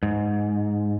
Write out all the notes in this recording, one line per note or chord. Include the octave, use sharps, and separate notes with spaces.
G#2